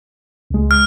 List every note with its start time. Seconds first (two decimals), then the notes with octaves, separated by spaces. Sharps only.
0.50 C#2 G#3
0.71 F6